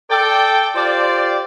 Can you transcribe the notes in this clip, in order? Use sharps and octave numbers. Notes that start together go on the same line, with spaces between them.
A4 D5 G5
F4 G4 C5 D5